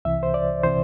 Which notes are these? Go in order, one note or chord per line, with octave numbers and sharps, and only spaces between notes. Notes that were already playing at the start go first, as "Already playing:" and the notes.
C2 C3 E3 E5
C5
D5
C3 E3 C5